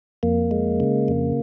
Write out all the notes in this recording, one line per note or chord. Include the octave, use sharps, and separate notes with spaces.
F2 A#3
G#3
C#3
F2